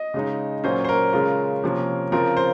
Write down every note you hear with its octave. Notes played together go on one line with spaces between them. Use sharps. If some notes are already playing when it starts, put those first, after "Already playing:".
Already playing: D#5
C#3 G#3 D#4
A#2 F#3 C#4 C5
C5
A#4
C#3 G#3 C#4 F4 A#4
C3 F3 A#3 C#4
C#3 F3 C4 F4 A#4
C5